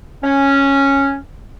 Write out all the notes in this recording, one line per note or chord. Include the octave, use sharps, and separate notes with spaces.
C#4